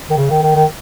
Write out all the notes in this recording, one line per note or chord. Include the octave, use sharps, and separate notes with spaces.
D#3
C#3
D#3
D#3
D#3